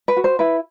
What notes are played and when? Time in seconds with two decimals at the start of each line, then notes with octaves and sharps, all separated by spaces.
0.08 B4
0.16 F#4
0.24 C5
0.39 E4 B4